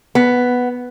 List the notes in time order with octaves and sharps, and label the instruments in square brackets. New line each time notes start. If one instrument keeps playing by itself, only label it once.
[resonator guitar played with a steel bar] B3